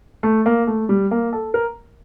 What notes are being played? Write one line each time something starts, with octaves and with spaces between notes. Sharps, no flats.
A3
A#3
A3
G3
A#3
A4
A#4